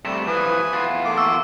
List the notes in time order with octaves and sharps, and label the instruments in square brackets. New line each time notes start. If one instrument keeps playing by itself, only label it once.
[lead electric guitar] C3 A3 [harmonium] G3 [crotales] E7
[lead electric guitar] E3 F3 [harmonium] B4 G#5 [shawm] D#6
[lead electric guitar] E2 F4
[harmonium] A3 A#3 [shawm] D6
[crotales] C#6 E6